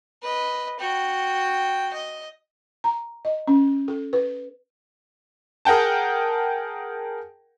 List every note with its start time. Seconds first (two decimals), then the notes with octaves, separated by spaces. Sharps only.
0.22 B4 D#5
0.79 F#4 G5
1.93 D#5
2.84 A#5
3.25 D#5
3.48 C#4
3.88 A4
4.13 B4
5.65 G#4 A#4 F#5 G5 A5